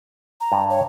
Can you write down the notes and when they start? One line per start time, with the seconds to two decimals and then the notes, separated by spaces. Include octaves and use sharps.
0.41 A#5
0.52 G2
0.70 C#5